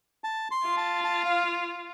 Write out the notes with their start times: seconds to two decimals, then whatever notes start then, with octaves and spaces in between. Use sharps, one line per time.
0.24 A5
0.51 C6
0.64 F4
0.77 A5
1.04 A5
1.25 F5